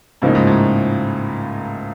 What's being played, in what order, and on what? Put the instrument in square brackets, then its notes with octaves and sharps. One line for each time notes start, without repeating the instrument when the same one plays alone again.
[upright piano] C#2 C#3 F3 A#3 D#4 [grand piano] A2
[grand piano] G#2
A2